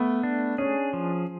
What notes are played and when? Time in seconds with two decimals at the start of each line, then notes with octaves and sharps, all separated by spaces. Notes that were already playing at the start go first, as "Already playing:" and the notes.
Already playing: A3 B3
0.23 D4
0.58 C#4 G#4
0.93 F3